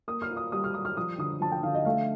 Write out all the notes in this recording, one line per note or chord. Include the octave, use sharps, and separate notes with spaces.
A#3 D#6
F6
F4
D#6
G3 D#6
F6
G3 D#6
F6
F3 D#6
D3 D#6
F3 A5
G5
D3 F5
D#5
A3 F5